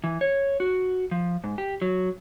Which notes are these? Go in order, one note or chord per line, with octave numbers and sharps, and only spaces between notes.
E3
C#5
F#4
F3
G#2
G4
F#3